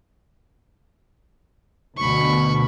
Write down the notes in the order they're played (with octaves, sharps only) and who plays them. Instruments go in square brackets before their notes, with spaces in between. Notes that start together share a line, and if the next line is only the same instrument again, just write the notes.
[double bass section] D2 B2 [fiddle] B5 C#6